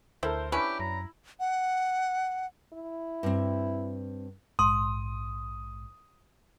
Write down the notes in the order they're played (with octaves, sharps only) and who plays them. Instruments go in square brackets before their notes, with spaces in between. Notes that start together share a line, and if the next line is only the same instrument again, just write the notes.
[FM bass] D2 [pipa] E4 [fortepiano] A4 A#4 C5
[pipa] C#4 D4 B4 [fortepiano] E4 B5 [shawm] G4
[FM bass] F#2 [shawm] A#5
[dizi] F#5
[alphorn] E4
[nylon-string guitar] G2 C4
[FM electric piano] A#1 G#2 [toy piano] C6 [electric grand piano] D#6